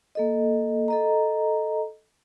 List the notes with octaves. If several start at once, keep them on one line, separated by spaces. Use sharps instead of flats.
A#3 A4 D#5
A4 D#5 A#5